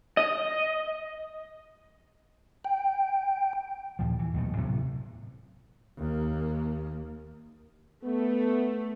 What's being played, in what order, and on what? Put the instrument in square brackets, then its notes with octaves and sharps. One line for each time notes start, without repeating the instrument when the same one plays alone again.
[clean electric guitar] D#5
[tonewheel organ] G5
[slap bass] D#2 A#2 F3
E3
D#2 B2 F#3 A3
A2 C3 F#3 B3
[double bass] D#2 A#3
[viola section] A3 [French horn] B3